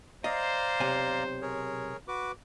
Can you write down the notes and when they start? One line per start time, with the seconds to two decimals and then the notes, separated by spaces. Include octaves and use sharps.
0.24 C5 D5 D#5 F5 A#5
0.80 B1 C3 G#5
1.42 G#4 A#4 C#5
2.08 F#4 B4 D6